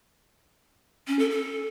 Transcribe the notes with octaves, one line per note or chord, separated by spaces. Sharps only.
C#4
A4
A4